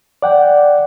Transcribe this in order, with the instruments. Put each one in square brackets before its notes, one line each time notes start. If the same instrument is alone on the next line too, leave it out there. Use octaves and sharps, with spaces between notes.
[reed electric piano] D5 F#5 G5